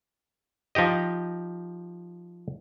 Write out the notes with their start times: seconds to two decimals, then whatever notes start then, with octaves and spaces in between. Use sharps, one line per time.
0.75 F3 D#4 G4 D#5